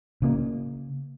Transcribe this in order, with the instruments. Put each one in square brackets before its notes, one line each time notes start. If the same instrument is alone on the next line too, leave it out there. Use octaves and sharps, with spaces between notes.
[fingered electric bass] C#3 A#3